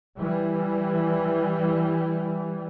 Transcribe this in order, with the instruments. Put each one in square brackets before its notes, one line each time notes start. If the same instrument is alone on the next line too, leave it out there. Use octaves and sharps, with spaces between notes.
[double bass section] E3 G3